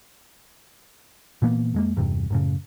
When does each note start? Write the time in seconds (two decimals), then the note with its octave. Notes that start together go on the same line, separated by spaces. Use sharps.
1.42 A#2 E3 A#3 B3
1.74 F2 G#3 A#3
1.97 E2 G2 C3
2.30 F#2 A2 C#3